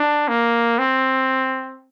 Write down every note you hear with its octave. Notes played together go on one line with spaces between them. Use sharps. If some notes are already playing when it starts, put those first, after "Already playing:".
Already playing: D4
A#3
C4